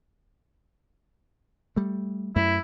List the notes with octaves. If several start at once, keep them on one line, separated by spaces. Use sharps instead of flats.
G3 A3
F#2 A3 E4